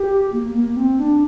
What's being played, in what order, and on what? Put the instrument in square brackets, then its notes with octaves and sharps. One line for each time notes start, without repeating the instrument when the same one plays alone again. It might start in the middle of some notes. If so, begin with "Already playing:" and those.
Already playing: [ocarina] G4
A#3
A#3
C4
D4